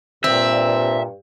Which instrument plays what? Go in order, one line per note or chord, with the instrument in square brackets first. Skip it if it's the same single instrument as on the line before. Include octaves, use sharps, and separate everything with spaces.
[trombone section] G2 [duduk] A#2 [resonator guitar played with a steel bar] C4 [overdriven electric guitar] E5